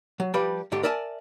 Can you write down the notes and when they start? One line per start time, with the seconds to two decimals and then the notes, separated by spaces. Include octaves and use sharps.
0.20 F#3
0.34 F3 G3 G4 B4 D5
0.72 G#2 D3 A3 G4
0.83 A#4 D5 E5 G#5 A5